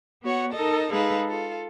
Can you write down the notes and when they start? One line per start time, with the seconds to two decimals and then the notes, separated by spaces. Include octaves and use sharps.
0.23 B3 F#4 C#5 F#5
0.53 D#4 A4 A#4 D#5 A5
0.91 G#3 D#4 G#4 A4 B4 F5
1.29 F4 A4